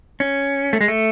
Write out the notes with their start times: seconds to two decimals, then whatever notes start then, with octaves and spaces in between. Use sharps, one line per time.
0.20 C#4
0.73 A3
0.81 G#3
0.88 A3